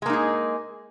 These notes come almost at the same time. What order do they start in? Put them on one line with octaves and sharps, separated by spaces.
G#3 A#3 D#4 G#4